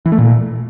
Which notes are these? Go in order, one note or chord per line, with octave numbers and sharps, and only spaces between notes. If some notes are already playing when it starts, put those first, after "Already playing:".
E3
A3
A#2